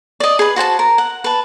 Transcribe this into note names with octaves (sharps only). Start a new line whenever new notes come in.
D5 D#5
G#4 B4
F#4 C5 G#5 A5
A#4
F#5
B4 A5